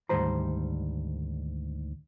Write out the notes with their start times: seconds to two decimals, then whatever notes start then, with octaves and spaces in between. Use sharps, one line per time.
0.09 D2 G#2 D#3 G3 C5 A#5